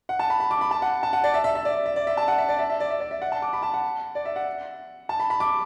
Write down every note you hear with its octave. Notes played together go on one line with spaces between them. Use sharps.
F#5
A5
B5
B5
D6
B5
A5
F#5
A5
F#5
D5
E5
E5
E5
D5
E5
D5
E5
A5
F#5
E5
D5
E5
E5
D5
E5
D5
E5
F#5
A5
D6
B5
A5
F#5
D5
E5
F#5
A5
B5
B5
D6